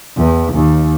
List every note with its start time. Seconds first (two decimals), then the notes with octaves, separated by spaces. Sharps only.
0.16 E2
0.54 D#2